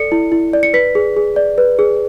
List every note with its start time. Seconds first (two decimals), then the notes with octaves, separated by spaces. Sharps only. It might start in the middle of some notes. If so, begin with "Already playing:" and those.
Already playing: A4 D5 C#7
0.12 E4
0.32 E4
0.54 D5
0.63 C#7
0.73 B4 B6
0.95 G#4
1.17 G#4
1.36 D5
1.58 B4
1.79 G#4